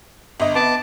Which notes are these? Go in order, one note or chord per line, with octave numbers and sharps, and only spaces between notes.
G1 D#5
B3 A5 D6